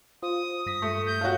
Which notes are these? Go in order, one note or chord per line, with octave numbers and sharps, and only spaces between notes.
F4 C5 D#6
G2 D#6 A#6 B6
A3
G6
F4 F#4 A4 C#5